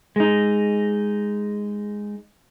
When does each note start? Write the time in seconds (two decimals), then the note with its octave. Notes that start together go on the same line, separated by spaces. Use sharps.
0.16 G#3 D#4